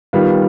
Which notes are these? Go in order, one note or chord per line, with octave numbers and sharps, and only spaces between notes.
D#3 G3 B3 F4